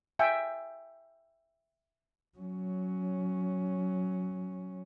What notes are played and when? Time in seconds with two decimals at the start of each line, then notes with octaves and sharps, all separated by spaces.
0.19 E5 G5 G#5
2.38 F#3 C#4